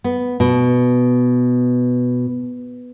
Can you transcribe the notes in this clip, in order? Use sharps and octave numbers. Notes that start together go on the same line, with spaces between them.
B3
B2